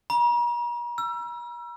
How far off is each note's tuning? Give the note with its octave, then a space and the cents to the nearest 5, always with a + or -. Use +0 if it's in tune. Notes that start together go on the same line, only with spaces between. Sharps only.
A#5 +45
E6 +30